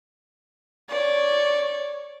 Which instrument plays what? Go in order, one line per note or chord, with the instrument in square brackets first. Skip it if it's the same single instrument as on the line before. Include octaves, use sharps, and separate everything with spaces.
[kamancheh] C#5 D5